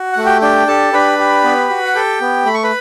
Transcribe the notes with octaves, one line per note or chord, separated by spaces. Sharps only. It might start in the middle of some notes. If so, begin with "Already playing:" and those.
Already playing: F#4
A3 F#5
G4 G5
D4 G4 G5
G4 A4 A5
D4 B4 B5
G4
B3
F#4
F#5
G4 A4 G5
B3
A3 B5
C#6
B4 B5